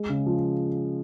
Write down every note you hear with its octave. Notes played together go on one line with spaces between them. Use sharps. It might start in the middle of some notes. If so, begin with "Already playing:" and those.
Already playing: G#3
C#3
F3